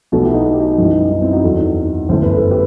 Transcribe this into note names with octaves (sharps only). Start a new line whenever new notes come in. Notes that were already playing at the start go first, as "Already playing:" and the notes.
B1 B2 F#3 A3 F#4 A4
E4 G4
D#4 F#4
F#4
G4
D#4 F#4
F#2 E3 G3
D#4
C4 E4
D#4 F#4
E2 D#3 F#3 F#4 A4
G1 F#2 E3 A3 C5
B4
A4
G4 B4